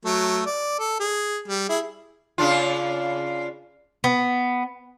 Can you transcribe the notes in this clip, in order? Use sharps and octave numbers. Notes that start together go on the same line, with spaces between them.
F#3 A3
D5
A4
G#4
G3
E4 G#4
C#3 D4 F4
B3